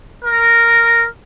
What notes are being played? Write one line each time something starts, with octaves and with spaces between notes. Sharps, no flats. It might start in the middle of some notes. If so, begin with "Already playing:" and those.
A#4